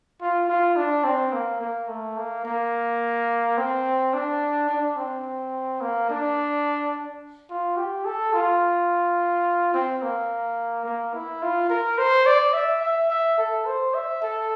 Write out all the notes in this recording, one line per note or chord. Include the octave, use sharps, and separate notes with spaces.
F4
F4
D4
C4
A#3
A#3
A3
A#3
A#3
C4
D4
D4
C4
A#3
D4
F4
G4
A4
F4
C4
A#3
A#3
E4
F4
A#4
C5
D5
E5
E5
E5
A4
C5
E5
A4